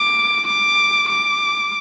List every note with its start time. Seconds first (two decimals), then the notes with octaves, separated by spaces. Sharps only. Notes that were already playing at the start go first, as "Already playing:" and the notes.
Already playing: D6
0.47 D6
1.09 D6